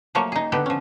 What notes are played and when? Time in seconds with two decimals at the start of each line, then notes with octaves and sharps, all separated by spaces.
0.15 F3 F#3 A3 A#3 C#5
0.32 D#4 G#4
0.52 D3 B3 G4 A4 G5
0.66 F3 C#4